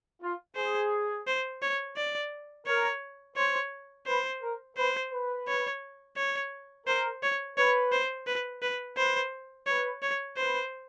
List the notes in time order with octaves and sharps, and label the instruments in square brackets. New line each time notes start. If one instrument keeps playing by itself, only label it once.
[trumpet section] F4
[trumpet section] G#4 [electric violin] C5
[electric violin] C5
C#5
D5
[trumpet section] A#4 [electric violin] C#5
[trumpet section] C5 [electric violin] C#5
[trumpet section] B4 [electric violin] C5
[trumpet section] A#4
[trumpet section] B4 [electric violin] C5
[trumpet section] B4
[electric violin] C#5
C#5
[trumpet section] A#4 [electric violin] C5
[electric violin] C#5
[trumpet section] B4 [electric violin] C#5
[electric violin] C5
B4
B4
[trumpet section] B4 [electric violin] C5
[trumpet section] B4 [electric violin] C#5
[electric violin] C#5
[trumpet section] B4 [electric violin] C5